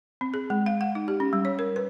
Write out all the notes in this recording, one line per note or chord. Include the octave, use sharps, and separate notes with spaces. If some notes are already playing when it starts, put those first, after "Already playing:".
C4
G#4
G#3
F5
F#5
D#4
G4
C#4
G3
C#5
A#4
B4